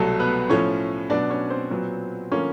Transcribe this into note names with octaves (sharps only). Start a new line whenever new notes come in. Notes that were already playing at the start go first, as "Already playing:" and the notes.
Already playing: C2 B2 F#3 A3 A4
B3 B4
A2 F3 A3 C#4 C#5
B2 F#3 B3 D4 D5
C#4 C#5
C4 C5
A#2 F#3 B3
D3 F3 A#3 C#4 C#5